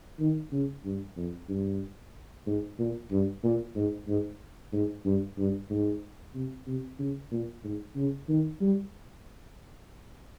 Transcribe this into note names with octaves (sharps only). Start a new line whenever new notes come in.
D#3
C#3
G2
F2
G2
G#2
A#2
G2
A#2
G#2
G#2
G#2
G2
G2
G#2
C3
C3
C#3
A#2
G#2
C#3
D#3
G3